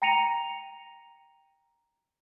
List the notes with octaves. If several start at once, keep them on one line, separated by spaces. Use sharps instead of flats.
G5 A#5 A#6 C#7 D#7 F7